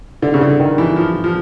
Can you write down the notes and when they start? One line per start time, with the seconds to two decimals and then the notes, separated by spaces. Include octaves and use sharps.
0.22 D3
0.34 C#3
0.41 D3
0.59 D#3
0.78 E3
0.96 F3
1.24 F3